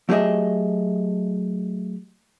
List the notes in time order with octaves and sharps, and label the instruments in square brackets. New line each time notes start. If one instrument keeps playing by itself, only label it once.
[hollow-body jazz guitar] F#3 A3 G4 G#4 D#5 E5